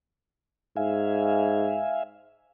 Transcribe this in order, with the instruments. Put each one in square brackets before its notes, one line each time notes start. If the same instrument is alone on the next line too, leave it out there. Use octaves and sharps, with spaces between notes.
[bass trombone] G#2 [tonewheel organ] E5 F5 G#5